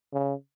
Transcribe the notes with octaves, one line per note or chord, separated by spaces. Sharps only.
C#3